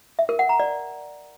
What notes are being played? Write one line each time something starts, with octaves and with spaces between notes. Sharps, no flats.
E5
A#4
F#5
A#5
D5